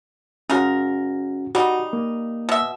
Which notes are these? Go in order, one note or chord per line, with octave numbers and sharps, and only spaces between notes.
C#3 G#3 C#4 F#4 A#4
G3 D#4 F#4
A#3
B2 E5